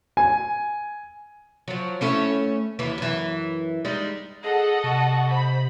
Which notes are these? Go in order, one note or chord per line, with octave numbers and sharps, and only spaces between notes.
G#5
F3 F#3
A3 C#4 E4
D#2 E3
F#2 E3
G3 G#3 D#4
G#4 A4 D#5 F#5
C3 C#6
C5 B5